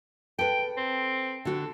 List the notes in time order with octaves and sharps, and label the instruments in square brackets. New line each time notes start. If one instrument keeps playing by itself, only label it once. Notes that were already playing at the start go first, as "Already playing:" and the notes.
[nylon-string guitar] A4 B4 [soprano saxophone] G5
[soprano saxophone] C4
[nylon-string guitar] D3 F#4 [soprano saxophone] A4